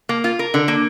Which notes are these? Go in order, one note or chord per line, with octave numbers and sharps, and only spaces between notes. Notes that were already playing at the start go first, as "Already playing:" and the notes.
A#3
F4
A#4
D3
A#3